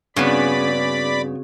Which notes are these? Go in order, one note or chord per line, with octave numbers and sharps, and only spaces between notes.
G2 C#3 B3 C4 F#4 G#4 D5 B5